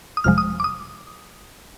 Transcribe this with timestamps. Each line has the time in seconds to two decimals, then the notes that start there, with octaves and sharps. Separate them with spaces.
0.17 D#6
0.24 G1 F2 C3 F3 G#3 F6
0.38 D#6
0.60 D6
0.64 D#6